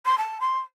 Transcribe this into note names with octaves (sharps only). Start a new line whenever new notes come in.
C6
A5
C6